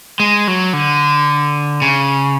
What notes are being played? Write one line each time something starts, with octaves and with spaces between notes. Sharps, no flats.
G#3
F#3
D3
C#3